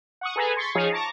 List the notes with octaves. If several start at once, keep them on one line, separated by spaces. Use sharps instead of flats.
F#5 C#6 D#6
G#4 A4 B4 G#5 A#5
C6 C#6 G#6 A6 B6 C#7
F3 D#4 G#4 C#5 F5
A5 A#5 C#6 D6 A#6